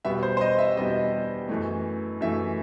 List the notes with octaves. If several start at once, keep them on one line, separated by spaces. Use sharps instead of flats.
E2 B2 G3 B3 E5
C5
C5
D#5
E5
E2 B2 G3 B3 D#5
F#2 E3 A3
F#2 E3 A3 E5